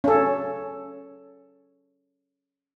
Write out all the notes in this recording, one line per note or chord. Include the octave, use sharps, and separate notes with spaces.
C#4 A4